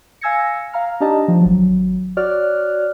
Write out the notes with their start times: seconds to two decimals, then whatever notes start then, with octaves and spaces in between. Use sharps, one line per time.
0.21 F5 G#5 E6 G#6 A#6 C#7
0.73 F5 A#5 F6
1.00 D4 D#4 G4 D#5 A5 A#5
1.28 F3
1.41 G#1 F#3
2.17 F#4 C#5 D5 F6 F#6